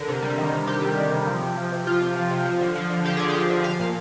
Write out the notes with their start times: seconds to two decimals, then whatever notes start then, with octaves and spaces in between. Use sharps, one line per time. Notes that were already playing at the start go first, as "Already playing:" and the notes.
Already playing: D3 A#4
0.09 C3
0.22 G3
0.38 D#3
0.53 C3
0.67 C3 G4
0.82 G3
0.97 D#3
1.12 C3
1.26 F3
1.42 C3
1.56 F3
1.72 C3
1.87 F3 F4
2.02 C3
2.15 F3
2.31 C3
2.45 F3
2.61 D3
2.75 F3
2.90 D3
3.05 F3 G4
3.17 D3 G#4
3.29 F3 G4
3.50 D3
3.64 F3 F5
3.80 A#2